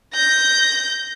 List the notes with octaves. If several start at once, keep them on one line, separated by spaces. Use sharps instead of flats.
G6 A#6